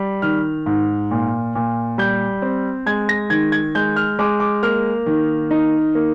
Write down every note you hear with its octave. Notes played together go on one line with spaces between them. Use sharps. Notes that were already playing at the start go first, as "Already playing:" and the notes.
Already playing: G3
D#3 F6
G#2
A#2
A#2
G3 G6
C4
G#3 G#6
A#6
D#3 G#6
G#6
G#3 G6
F6
G#3 D6
D6
A#3 F6
D#3
D#4
A#3